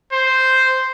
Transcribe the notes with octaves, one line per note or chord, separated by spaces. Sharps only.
C5